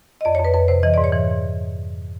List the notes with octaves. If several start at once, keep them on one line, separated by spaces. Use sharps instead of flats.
D#5
F2 D5
C#5
F2 B4
F2 B4
C3 C5
E3 D#5
G#2 D5
C#5
E3